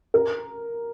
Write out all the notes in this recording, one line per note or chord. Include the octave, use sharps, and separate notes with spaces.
A#4